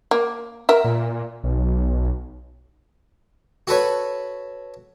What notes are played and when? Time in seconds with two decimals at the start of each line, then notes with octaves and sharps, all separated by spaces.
0.11 A#3
0.69 A#4 E5
0.84 A#2
1.44 B1
3.67 F#4 A4 B4 C#5